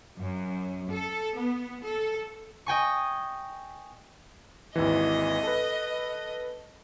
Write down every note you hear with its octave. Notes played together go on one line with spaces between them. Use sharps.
F#2
A4
B3
A4
D#5 G5 G#5 C#6
G#1 D#2 E3 D#5
A4 B4